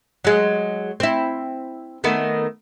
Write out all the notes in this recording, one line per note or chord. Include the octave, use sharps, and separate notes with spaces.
F#3 G#3
C4 E4
D#3 A3 B3